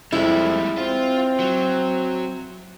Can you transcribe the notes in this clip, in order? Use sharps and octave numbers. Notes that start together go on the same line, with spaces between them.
F2 G3 G#3 E4
C4 F4
F#3